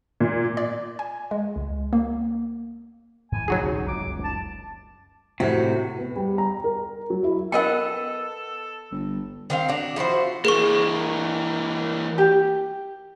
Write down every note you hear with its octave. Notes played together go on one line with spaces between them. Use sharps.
A#2
D5
G#5
G#3
C#2
A#3
G#2 E3 G#5
D1 G#1 F#3 C4 D#4 F#4 G#4
C2 F#2 D3
F#1 C#2 F#2 D6
A5
A2 C3 F#4
B3
G3
A#5
A#4
F#3
E4
B3 A4 A#4 D#5 F#5 G5
G1
D#3 C4 F5
D4 F#4
F3 E4 F#4 C5
E3 A#3 G#4 C#6
G4